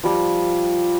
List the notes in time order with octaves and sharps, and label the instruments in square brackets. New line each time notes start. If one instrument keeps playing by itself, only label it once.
[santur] F3 G3